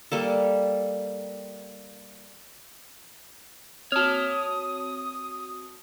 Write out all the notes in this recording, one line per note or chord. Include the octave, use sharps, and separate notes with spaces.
G3 A#3 A4
C4 F#4 C#5 A5 D#6 F6